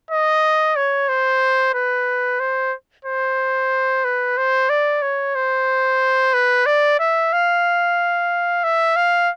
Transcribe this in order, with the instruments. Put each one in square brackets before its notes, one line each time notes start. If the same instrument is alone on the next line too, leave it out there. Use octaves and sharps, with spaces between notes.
[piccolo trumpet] D#5
C#5
C5
B4
C5
C5
B4
C5
D5
C#5
C5
B4
D5
E5
F5
E5
F5